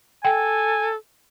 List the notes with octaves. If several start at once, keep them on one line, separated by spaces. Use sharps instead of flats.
A4 G5 G#5